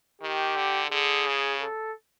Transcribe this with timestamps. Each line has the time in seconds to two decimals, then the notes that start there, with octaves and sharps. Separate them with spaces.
0.22 D#3 G4
0.56 D3
0.91 D3 G#4
1.27 C#3
1.61 A4